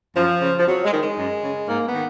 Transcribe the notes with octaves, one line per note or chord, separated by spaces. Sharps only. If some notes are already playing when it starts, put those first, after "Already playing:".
F#2 F3
C#3
F3
F2 F#3
G#3
D#3
G#3
F#2
C#3
G#2 A#3
B3
D#3